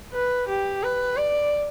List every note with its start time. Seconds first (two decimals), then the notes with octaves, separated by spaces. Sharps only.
0.13 B4
0.48 G4
0.83 B4
1.17 D5